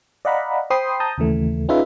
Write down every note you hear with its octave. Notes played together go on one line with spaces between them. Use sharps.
D5 D#5 F5 F#5 A#5 B5
C5 G5 B5 C6 D#6 C7
A5 A#5 D#6 G6
D#2 C#3 E3 A3
C#4 D#4 F4 G#4 B4 E5